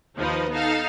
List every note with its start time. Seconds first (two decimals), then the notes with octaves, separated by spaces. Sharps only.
0.17 D#2 F3 D#4 B4 D#5
0.51 B3 D#4 A4 F5